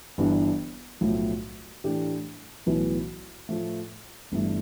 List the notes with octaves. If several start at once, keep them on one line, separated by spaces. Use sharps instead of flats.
G1 G2 E3 G3 D4
B1 A2 F3 A3
A2 E3 A3 D4 G4
B1 A2 E3 B3 E4
A2 F3 A3
G1 G2 E3 A3